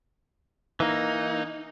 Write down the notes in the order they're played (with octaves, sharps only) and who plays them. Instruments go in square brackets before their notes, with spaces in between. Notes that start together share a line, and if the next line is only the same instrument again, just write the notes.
[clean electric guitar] E3 A#3 [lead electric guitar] D#4